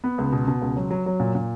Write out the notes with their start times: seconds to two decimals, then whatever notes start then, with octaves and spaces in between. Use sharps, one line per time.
0.04 B3
0.18 C#2
0.32 B2
0.47 B2
0.62 C#2
0.76 F#3
0.91 F#3
1.06 F#3
1.20 A#2
1.35 A#2